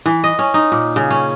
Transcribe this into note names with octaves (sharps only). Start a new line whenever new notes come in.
E3
D#5
C#4
D#4
A#2
C#3
C#4